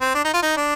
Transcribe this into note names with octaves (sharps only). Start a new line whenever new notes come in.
C4
D4
D#4
F4
D#4
D4